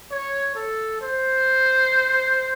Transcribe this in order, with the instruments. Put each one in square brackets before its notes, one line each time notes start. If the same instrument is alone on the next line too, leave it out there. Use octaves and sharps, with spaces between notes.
[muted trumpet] C#5
A4
C5